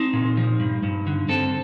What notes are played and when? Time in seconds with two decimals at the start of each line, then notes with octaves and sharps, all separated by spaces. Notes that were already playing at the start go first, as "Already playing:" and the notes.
Already playing: C4 D#4
0.13 A#2
0.37 F3
0.60 G2
0.83 G2
1.07 D3
1.29 C4 A4